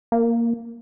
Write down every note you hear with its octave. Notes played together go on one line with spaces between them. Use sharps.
A#3